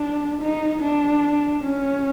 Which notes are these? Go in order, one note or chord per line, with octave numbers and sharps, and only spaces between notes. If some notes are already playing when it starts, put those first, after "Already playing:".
Already playing: D4
D#4
D4
C#4